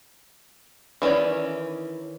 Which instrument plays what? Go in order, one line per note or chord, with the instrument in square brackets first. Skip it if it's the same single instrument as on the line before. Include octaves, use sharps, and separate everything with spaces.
[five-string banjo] D#3 E3 C#4 D5